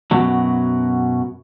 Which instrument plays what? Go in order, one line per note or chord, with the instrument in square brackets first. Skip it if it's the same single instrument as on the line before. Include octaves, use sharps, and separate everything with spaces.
[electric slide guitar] F#2 B2 F#3